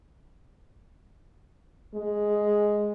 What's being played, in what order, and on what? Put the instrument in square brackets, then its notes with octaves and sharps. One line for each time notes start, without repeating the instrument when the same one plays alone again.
[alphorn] G#3